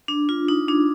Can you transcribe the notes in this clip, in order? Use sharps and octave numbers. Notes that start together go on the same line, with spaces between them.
D4
F4
D#4
D4